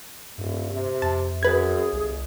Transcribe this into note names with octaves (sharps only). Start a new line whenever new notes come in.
D#1 G2
C3
F2 A5
F#2 G#4 B4 G#6
G1 C2